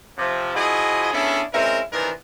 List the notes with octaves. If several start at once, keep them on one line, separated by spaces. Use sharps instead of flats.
C3 F3
F3 E4 F#4 G#4 D#5
B3 C#4 D4 E4 G#4 A4
G#3 C4 C#4 E4 A#4
C3 D#3 E3 B3 D4 A#4